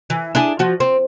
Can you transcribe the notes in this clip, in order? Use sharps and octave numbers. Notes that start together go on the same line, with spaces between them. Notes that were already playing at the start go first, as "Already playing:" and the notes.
E3
D4 E4 G#4
F3 F#4
C4